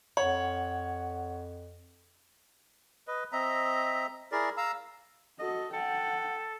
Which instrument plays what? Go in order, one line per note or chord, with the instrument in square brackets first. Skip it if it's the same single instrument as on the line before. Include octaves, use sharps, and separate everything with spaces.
[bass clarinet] F2 [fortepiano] C#5 [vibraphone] F#5
[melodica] B4 D#5
C4 D#5 E5 A#5
E4 G#4 A#4 D5
F5 A#5 E6
[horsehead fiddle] F#4 A4 [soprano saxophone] D#5
[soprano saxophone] A4 [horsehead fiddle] F#5 G5